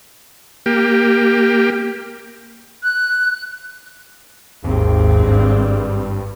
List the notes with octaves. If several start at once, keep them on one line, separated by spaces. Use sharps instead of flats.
A#3 G4
F#6
G#1 D#2 C4
G2